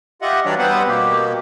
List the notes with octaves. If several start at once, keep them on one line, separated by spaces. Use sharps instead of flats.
F4 G4 D#5 E5 F#5
E3 F#3 G3 D4 C#5 D5
G3 B3 C4 B4 C5 F#5
B2 A#3 G4